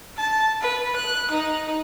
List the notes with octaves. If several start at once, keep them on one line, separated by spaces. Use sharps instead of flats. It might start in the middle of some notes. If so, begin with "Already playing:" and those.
A5
B4
F#6
D#4